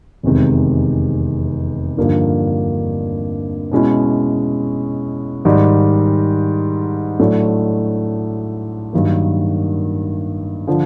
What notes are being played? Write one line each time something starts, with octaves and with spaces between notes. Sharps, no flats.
F1 E2 C3 D#3 G#3
G2 D3 F3 A#3 D#4
B2 G#3 C#4 E4
G#2 D#3 G3
A2 F#3 A3 D4
G2 D#3 F#3 A#3
D3 F3